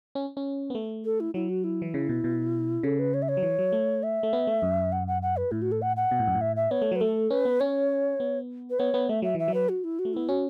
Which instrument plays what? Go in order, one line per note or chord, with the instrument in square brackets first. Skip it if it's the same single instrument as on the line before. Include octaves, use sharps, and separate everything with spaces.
[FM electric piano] C#4
C#4
B3
A3
[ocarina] A4
E4
[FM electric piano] F#3 [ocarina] E4
[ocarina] F#4
E4
[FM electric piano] E3
C#3
B2
B2
[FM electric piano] C#3 [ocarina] A4
[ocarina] B4
C#5
E5
C#5
[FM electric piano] F#3
E3
F#3
A3
[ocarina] E5
[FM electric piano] A3
B3
A3
F#2
[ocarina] F#5
F#5
F#5
B4
[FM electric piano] A2 [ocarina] E4
[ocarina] F#4
A4
F#5
F#5
[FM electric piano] B2
A2
F#2
A2
[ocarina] E5
E5
[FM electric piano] B3 [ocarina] C#5
[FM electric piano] A3
[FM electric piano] F#3 [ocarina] B4
[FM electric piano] A3 [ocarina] A4
[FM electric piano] C#4 [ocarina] B4
[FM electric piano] B3
[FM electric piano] C#4 [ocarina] C#5
[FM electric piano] B3
[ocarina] B4
[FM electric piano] B3 [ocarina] C#5
[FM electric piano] B3
[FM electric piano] A3 [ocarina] E5
[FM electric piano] F#3 [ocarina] E5
[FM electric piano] E3 [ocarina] E5
[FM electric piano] F#3
[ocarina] B4
F#4
E4
F#4
[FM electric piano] A3
[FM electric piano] B3 [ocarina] E4
[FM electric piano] C#4 [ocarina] F#4